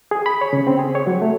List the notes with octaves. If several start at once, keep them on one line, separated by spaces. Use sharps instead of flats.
G#4
B5
C#5
C#3
C4
G#4
C#5
F#3
A3